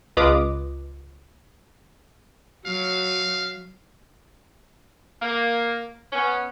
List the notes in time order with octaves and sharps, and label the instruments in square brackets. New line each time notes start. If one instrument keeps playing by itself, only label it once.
[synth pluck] C#2 F4 B4 D#5 D6 D#6
[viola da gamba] F#3 [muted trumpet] F5
[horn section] A#3
B3 C#4